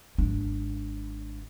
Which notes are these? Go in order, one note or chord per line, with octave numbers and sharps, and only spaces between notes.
G#1 D4